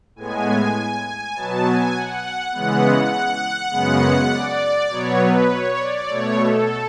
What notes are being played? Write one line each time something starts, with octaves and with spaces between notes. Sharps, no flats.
A2 G#3 B3 G#5
G#5
B2 F#3 B3 A5
G#5
F#5
C#3 E3 G#3 B3 F#5
F#5
F#2 C#3 G#3 B3
D5
B2 F#3 B3 C#5
B4
C#5
D5
B2 A3 C#5
A4